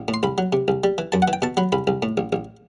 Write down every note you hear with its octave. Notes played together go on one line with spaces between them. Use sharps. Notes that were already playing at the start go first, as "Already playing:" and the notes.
Already playing: A1
A2
C6
C2 B5
F#3
C3
C2
G3
E3
F#2 A5
F#5
E3
G5
B2 A5
F#3 B5
C2 B5
C2
A2
A1
A1